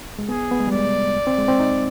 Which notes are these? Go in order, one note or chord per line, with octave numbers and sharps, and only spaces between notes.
G#3
B3 G#4
B3
G#3
G3
G#3 D5
C4
G#3
C4
D#4